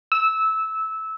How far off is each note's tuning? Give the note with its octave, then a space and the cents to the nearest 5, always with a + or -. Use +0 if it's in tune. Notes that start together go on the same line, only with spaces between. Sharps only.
E6 -15